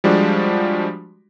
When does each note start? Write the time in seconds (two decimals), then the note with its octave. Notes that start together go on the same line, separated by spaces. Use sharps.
0.04 F3 G3 G#3 D4 F#4